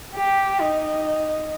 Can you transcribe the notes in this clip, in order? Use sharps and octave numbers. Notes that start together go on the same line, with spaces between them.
G4
D#4